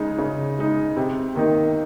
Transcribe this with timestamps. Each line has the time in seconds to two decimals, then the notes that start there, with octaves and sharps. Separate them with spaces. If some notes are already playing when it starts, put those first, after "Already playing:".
Already playing: C#3 G#3 D#4
0.19 C#3
0.58 G#3 D#4
0.97 C3
1.35 D#3 A#3 D#4